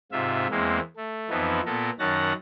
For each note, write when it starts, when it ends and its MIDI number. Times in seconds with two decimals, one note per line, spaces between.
0.12 0.47 44
0.12 0.47 48
0.12 0.47 65
0.12 0.47 76
0.51 0.80 40
0.51 0.80 56
0.51 0.80 58
0.51 0.80 60
0.96 1.29 57
1.30 1.61 41
1.30 1.61 52
1.30 1.61 53
1.30 1.61 59
1.30 1.61 63
1.66 1.90 46
1.66 1.90 59
1.66 1.90 69
1.66 1.90 70
1.99 2.33 42
1.99 2.33 51
1.99 2.33 61
1.99 2.33 78
1.99 2.33 81
1.99 2.33 94